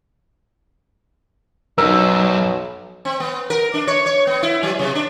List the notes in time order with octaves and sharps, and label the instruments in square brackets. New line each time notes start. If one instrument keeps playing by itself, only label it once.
[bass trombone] B1 [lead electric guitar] F#2 [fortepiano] D#4 A#4 [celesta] E6
[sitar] C4
B3
A#4
D4
C#5
C#5
B3
E4
F#3
C3
D4